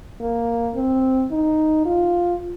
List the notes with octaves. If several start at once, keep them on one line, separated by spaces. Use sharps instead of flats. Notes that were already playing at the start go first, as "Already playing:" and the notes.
A#3
C4
D#4
F4